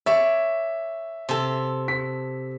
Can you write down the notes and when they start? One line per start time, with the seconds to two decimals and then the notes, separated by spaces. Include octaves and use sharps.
0.06 C#5 D5 E5
1.29 C3 A4
1.88 B6